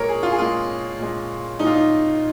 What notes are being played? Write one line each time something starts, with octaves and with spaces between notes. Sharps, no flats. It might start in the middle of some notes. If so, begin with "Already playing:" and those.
Already playing: A#2 G#3 A#4 C#5
G#4
F4
G#4
A#2 G#3 F4
A#2 G#3
A#2 G#3 D#4
F4
D#4